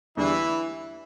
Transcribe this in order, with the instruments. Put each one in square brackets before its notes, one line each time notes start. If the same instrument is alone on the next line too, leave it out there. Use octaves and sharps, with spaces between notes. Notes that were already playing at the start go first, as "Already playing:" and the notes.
[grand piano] E2 D3 G3 D4 [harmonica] E3 E4